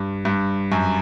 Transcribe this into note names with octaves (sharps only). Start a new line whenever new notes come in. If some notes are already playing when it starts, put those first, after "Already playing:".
Already playing: G2
G2
F#2